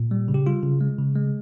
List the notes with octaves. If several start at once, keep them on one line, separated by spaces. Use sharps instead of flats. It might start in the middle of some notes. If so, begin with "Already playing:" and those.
Already playing: A#2
G3
C#3
G4
G3 F4
C#3
G#3
C#3
G#3